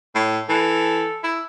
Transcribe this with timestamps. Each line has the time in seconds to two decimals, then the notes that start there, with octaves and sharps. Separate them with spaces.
0.15 A2
0.49 E3 A4
1.24 E4